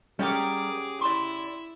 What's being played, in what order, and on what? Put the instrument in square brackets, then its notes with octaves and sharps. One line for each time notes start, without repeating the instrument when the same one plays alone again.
[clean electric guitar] G3 A#4 [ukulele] C#4 G4 F#5 [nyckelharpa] G#4 D6
[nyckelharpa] E4 [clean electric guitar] D5 C6